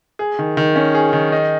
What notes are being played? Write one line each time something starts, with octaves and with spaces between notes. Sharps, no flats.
G#4
D#3
D#3
C#4
G#4
D#3
D#4